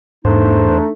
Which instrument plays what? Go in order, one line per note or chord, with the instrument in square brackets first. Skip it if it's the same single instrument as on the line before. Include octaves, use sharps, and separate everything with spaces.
[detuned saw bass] E2 [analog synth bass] G#2 [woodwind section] A3 D4 D#4 [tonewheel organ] C5